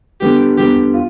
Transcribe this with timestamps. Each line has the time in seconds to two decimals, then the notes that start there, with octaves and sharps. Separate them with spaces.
0.21 D3 G3 B3 G4
0.57 D3 G3 B3 G4
0.94 F4